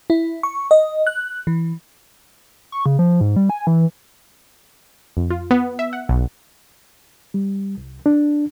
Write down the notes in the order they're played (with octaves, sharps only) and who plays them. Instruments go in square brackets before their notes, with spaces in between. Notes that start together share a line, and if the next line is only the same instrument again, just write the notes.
[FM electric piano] E4
C#6
D#5
F#6
E3
[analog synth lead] C#6
C#3
F3
G#2
G3
G#5
E3
[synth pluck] F2
F4
B3
E5
F#5
B1
[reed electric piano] G3
C2
D4